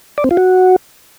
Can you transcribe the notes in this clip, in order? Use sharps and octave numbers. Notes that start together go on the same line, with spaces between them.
D5
C4
F4
F#4